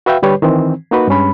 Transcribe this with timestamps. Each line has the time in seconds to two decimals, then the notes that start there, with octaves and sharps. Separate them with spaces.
0.06 F#4 B4 E5 F5 G5
0.22 D3 G3 G4 B4 C#5
0.42 D#3 E3 C4
0.91 A#3 D#4 F#4 B4
1.08 G2 G#3 C#4 B5